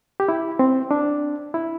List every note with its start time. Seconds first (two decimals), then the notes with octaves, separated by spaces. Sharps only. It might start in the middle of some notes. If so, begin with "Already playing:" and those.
0.20 G4
0.28 E4
0.59 C4
0.91 D4
1.54 E4